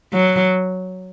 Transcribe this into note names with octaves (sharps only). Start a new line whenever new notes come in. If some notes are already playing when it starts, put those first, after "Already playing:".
F#3